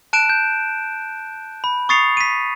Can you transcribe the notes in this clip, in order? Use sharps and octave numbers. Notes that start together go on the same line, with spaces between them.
A5 F#6 D7 E7
G6
B5
C#6 D#6 A6 C7 C#7 F7
B6 D#7